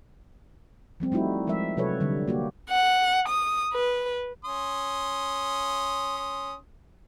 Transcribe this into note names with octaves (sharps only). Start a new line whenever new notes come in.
F3 G3 C4
G3 A3 D#4 E4 F#4
F3 G#3 A#4 E5
C3 F#3 F#4 A4 B4 C#5
D3 G3
A#3 F#4 G4
F#5
D#6
B4
C#4 C6 D#6